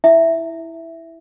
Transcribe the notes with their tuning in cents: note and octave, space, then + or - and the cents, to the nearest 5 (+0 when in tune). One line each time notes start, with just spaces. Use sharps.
E4 -5 E5 +0